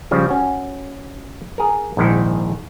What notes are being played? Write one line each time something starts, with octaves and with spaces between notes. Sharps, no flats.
C#3 F3 G3
C#4 F#4
G#4 A#4
A#1 G#2 D#3 E4 G5